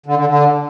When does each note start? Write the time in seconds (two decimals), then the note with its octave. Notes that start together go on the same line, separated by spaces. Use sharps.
0.06 D3
0.17 D3
0.27 D3